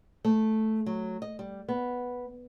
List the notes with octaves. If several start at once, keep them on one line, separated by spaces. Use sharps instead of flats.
A3
F#3
D#5
G3
B3